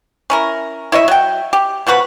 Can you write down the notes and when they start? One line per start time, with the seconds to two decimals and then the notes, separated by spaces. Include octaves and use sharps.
0.30 C#4 E4 A#4
0.92 E4 C#5 D#5 E5
1.08 F#3 G5
1.53 G4
1.87 B2 F3 F#4 B4